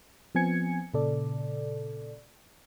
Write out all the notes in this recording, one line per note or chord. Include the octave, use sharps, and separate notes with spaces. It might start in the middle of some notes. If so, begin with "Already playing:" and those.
F3 B3 C4 G#5 G#6 C#7
A#2 C#3 A4 D5